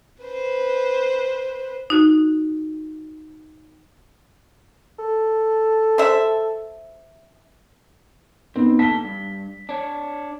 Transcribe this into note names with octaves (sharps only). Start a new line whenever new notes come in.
B4 C5
D#4 F#4
A4
C5 E5
B3 C4 D#4
D3 A#3 A5 B6 G7
G2
D4 C#5